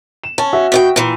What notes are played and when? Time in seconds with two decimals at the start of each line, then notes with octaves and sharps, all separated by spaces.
0.24 E7
0.38 C#4 A5
0.53 F#4 E5
0.72 B2 D5 G5
0.96 A#2 E3